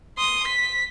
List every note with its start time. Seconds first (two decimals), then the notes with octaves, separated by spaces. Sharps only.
0.18 C6 D#6
0.47 B6